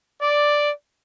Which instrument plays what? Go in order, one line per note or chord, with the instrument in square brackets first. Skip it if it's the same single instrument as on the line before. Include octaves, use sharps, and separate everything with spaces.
[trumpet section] D5